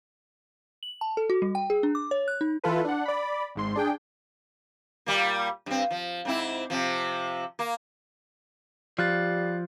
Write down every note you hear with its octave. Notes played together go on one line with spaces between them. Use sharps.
F#7
A5
A4
F#4
G3
G5
G#4
D4
D6
C#5
F#6
D#4
E3 E4 F4 A4 B4
D4 F#5
D5 B5
G#1 G#2 C6
D4 G#4 G5
A#2 G3 A#3
G2 C4
F3
G#2 C4 E4
C3 F3
A#3
F3 G3 F5 F#6 A6